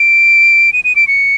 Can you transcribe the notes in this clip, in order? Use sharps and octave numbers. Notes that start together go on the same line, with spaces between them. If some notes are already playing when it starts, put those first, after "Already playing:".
Already playing: D7
D#7
D#7
D7
C#7